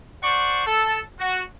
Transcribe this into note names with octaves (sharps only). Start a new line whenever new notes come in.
C5 D5 F#5 C#6
A4
F#4